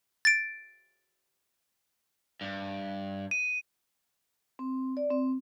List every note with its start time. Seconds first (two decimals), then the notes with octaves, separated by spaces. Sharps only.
0.25 A6 D7
2.41 G2
3.31 D#7
4.59 C4
4.97 D5
5.11 C4